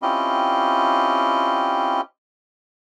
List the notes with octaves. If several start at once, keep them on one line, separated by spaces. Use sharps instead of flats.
C4 C#4 E4 F4 G4 D#5